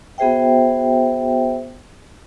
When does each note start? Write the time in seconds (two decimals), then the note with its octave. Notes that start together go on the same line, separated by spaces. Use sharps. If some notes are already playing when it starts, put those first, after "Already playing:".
0.18 B3 F#4 G#4 C5 E5 G5